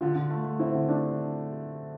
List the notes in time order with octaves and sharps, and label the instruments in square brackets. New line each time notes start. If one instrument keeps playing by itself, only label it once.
[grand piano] D3 [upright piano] F4
[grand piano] D3
A3
A3
[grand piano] C4 [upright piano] E4
[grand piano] D3
[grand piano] A3 [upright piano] D4